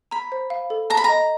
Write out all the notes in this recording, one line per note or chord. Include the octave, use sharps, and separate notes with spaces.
A#5 B5
C5
F5
A4
A5 A#5
B5
D#5 A#5